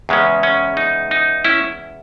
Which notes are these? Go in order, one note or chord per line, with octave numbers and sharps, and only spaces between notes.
E2 C#3 G#3 C#4
C#4
D#4
D#4
C#4 E4